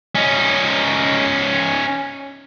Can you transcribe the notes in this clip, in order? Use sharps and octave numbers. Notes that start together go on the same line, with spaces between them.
C#4 D#4